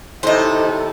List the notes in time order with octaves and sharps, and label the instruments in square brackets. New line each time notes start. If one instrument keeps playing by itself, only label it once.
[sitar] D#2 C3 D#4 [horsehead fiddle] E4 A4 [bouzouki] C5 D#5